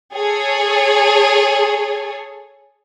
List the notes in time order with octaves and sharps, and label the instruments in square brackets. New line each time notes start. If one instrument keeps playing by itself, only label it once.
[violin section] G#4 A4 C#5